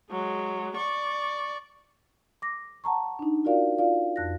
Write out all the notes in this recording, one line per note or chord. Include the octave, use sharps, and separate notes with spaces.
F#3 G#3
D5 C#6
D6 A#6
F#5 A5 A#5 C#6
D4 D#4
F4 F#4 A#4 D5 F5
F4 D5 F5
F2 F#6 A#6